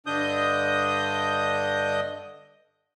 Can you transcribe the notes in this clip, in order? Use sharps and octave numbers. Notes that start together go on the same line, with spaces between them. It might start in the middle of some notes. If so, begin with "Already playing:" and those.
G2 D3 D4 D#5 D#6 G6